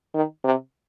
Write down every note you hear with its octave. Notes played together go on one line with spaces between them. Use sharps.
D#3
C3